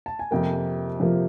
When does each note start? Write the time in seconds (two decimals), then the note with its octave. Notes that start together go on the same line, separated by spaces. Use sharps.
0.06 A5
0.19 G#5
0.31 F2 C3 F3 A#3 G5
1.00 F2 C3 F3 A#3